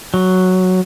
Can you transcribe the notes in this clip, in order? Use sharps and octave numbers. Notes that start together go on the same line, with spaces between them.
F#3